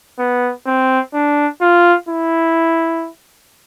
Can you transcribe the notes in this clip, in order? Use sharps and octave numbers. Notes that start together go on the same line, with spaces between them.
B3
C4
D4
F4
E4